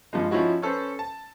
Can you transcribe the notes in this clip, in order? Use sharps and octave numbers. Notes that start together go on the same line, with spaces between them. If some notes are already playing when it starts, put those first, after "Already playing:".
G2 F3 G#3
F3 C#4 D#4 E4 F#4
C#4 A4 B4 C5
A5